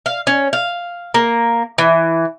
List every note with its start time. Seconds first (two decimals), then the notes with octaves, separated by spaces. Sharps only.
0.06 F5
0.27 C#4
0.53 F5
1.14 A#3
1.78 E3